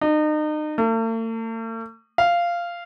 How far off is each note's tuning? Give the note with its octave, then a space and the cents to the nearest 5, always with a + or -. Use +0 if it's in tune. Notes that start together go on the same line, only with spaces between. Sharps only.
D#4 -35
A3 +45
F5 -10